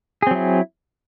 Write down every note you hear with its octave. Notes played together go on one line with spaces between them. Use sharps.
F#3 C4 E4 G#4